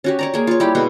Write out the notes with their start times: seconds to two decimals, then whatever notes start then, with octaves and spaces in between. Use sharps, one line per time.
0.04 C#4 F#4 G4
0.19 C#5 D5 A#5
0.34 A#3 G#4
0.47 F4 C#5
0.60 G3 E4 G4 G5
0.75 B2 G#3 F#5 C6